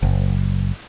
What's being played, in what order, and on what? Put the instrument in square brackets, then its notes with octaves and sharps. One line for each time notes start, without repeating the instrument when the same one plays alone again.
[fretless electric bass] F#1